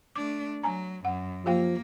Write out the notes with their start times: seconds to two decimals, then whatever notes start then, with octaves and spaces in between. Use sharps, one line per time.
0.16 A3 D4 D6
0.63 F#3 G#5 A#5
1.05 F#2 F#5
1.46 F3 A#3 G4 F5 G5